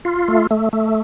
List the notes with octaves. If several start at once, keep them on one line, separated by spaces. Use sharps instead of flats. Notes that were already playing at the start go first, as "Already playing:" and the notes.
F4
A3
A3
A3